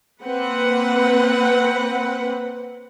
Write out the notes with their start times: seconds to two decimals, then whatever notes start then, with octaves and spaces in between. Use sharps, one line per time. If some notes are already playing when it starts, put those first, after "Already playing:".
0.22 A#3 C4 B4 F#5